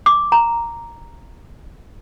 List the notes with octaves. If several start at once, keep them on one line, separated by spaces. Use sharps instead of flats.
D6
A#5